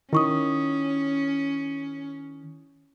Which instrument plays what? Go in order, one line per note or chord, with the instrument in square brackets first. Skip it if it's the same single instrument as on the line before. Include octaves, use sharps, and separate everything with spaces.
[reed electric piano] D#3 [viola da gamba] C#4 [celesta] E4 C#6 D#6